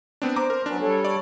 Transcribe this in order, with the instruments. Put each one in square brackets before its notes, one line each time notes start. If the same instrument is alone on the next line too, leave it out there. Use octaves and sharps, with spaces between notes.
[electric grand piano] B3 C4 D4
[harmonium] C5 [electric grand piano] A#5 D6
[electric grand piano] A#4
[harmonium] F#3 B3 C#4 [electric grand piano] D4
[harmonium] G3 A4 C#5
[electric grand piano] D5